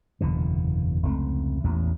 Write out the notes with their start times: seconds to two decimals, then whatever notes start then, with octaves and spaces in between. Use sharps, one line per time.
0.21 F#1 E2 B2 D3
1.03 F1 C#2 A3 C4
1.64 A1 E2 A#2